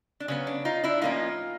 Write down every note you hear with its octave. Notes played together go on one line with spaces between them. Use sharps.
D4
C#3 F#3 B3 C#4
D4
D#4 F4
D4 E4
A2 F3 A#3 C#4 D#4 F4